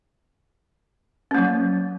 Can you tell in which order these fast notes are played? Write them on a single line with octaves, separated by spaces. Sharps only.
C#4 A#3 F#3